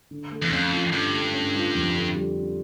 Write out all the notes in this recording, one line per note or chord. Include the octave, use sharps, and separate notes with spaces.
D3
A3
E2
F2 C#4
F4
G2 D3
A3
C#4
F4
F2
D3
G3
D4